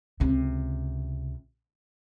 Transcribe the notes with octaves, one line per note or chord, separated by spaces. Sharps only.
C#2 C3